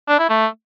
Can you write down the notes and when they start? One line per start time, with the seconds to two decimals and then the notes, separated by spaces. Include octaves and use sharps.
0.09 D4
0.19 E4
0.29 A3